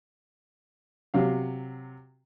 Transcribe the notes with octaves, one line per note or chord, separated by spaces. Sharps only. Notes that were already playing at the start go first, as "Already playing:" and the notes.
C3 F#3 F5